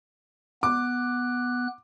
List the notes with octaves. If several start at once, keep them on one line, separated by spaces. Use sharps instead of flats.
B3 D6 F#6